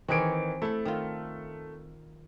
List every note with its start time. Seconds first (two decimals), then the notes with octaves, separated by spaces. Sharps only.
0.08 D#3 E3 C4 G#4 C#5 D7
0.62 A3 E4 A4
0.85 D#3 F4